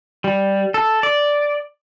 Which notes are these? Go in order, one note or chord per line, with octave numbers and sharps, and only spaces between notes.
G3
A4
D5